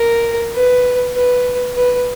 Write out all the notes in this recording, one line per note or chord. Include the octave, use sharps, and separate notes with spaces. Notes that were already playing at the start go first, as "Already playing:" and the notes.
Already playing: A#4
B4
B4
B4